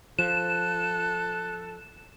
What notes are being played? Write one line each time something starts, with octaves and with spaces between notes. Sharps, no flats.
F3 A4 F#6 E7